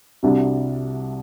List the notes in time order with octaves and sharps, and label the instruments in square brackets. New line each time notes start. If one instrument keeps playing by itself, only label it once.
[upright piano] C2 C3 G3 D4 F#4